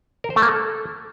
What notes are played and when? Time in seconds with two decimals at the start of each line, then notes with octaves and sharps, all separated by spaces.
0.24 A#4
0.30 C5
0.36 A3
0.42 A#3
0.48 A4